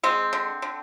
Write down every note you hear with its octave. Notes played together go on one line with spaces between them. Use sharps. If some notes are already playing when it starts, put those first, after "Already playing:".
G#3 C4
D3
D3